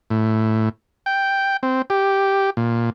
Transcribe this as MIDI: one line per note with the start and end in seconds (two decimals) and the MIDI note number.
0.10 0.69 45
1.06 1.57 79
1.63 1.82 60
1.90 2.50 67
2.57 2.90 46